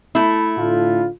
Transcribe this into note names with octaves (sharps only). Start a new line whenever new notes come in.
A3 E4
A2 D3 F4